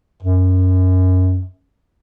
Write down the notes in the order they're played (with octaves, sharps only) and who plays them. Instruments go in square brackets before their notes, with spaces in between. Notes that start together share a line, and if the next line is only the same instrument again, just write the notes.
[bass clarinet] F#2